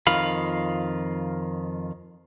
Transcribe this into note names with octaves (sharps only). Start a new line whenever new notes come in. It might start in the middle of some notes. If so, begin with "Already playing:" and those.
F2 D#3 F4 F5 B5